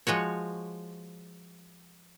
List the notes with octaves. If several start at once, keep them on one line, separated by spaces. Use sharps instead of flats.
F3 G#3 F#4 C#5